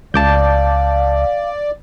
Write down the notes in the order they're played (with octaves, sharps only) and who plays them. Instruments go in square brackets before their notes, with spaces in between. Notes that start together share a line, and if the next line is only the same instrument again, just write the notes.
[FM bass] C#2 [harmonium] D5 [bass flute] F5 [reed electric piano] A5 D6 G6